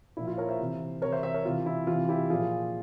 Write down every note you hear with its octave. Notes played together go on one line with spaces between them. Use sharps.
A#2 F3 E4
F4
A#4 C#5
C5 E5
C3 E3
C3 E3 A#4 C#5
C5 E5
C5 E5
A#4 C#5
C3 E3 F4
E4
C3 E3 F4
E4 G4
A#2 F3 F4 G#4